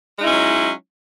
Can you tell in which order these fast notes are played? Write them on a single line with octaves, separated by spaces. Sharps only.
G#3 D#4 E4 C#4 F#3